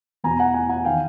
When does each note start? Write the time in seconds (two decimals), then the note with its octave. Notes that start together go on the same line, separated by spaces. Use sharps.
0.24 E2 B2 G#5 A#5
0.40 F#5 G#5
0.54 F#5 G#5
0.69 F#5 G#5
0.85 D#3 F5 G5